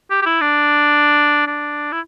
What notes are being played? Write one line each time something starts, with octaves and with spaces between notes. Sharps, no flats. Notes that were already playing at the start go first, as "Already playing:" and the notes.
G4
G4
E4
D4
D4
E4